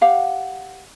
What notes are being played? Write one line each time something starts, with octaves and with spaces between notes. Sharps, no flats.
G4 F5 F#5